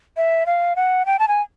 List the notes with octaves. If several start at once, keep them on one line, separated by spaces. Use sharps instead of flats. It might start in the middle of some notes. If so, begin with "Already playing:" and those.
E5
F5
F#5
G5
A5
G#5